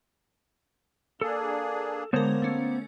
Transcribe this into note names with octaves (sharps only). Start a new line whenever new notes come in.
A#3 D4 G#4 A4
D3 G#3 A#3 B3 A#4 C5 C#5
A3 C#4